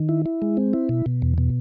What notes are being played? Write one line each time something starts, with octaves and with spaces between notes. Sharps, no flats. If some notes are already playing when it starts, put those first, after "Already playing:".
Already playing: D#3
E4
E4
G#3
C4
E4
B2
B2
E2
B2